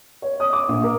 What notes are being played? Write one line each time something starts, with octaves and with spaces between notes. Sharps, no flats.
C#5
D#6
D6
A#1
A#4